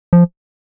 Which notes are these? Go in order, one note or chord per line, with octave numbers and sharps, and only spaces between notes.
F3